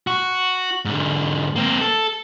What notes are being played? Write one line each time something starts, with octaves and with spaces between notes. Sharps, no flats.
F#4
G#2 D3
A#3 C4
A4